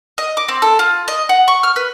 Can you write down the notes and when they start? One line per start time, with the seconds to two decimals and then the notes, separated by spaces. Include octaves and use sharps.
0.18 D#5
0.37 D6
0.48 C4
0.62 A4
0.79 F4
1.08 D#5
1.29 F#5
1.48 C#6
1.63 F6
1.76 B4